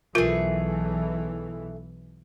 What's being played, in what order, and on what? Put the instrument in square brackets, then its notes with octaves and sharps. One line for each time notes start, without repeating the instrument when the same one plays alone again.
[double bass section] B1 E3 [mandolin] A3 G#4 [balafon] F4 A#4